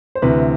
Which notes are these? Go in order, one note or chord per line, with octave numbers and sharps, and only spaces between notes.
C5
D2 C3 E3 B4